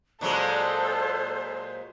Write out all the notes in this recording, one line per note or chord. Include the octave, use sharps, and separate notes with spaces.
A#2 F#3 G#3 A4 C5